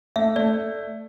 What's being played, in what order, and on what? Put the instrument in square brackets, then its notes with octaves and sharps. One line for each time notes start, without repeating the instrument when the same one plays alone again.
[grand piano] A3 [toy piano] E5
[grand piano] A3 [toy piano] D5